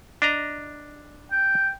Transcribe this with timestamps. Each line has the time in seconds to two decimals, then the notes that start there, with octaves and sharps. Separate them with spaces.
0.22 D4 D#5 A#5
1.32 G5